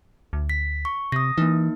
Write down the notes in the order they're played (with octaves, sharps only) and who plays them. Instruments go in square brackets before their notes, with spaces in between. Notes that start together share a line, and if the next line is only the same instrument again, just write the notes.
[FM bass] D2
[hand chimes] B6
C#6
[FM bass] C3 [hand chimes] D#6 A#6
[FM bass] E3 [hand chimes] A#3 D#4